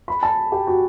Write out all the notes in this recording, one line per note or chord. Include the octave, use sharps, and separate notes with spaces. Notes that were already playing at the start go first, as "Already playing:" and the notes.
B5
A5
G4
F#4